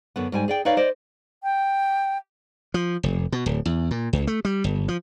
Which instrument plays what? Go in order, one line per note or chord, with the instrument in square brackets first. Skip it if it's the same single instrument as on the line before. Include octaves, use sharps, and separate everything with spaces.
[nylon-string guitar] F#2 D3 B3
G#2 G3 G#5
G#4 D5 G5
D#4 B4 C#5 D5 F5
C5 D5 D#5
[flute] G5
[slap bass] F3
F1
B2
D1
E2
A#2
C#2
A3
G3
G1
F3